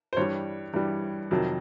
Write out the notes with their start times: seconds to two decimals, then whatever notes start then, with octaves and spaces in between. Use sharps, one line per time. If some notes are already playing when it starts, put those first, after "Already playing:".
0.13 C5
0.17 G2 E3 G3 C#5
0.74 G2 E3 G3
1.31 F2 C3 D#3 F#3